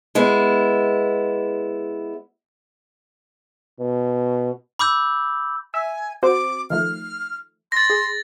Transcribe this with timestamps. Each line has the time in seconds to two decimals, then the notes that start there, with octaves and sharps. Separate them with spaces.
0.15 G#3 B3 E4
3.79 B2
4.79 B5 D6 E6 G6
5.74 E5 G#5
6.23 C4 F#4 C5 D6
6.70 D#3 F3 A3 F6
7.72 C6 A6 A#6
7.90 G#4